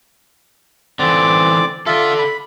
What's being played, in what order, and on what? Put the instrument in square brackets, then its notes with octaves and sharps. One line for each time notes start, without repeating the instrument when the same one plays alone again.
[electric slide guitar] D3 E3 [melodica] C4 D5 D6
[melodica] F4 E5 [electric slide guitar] A4 D5
[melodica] B5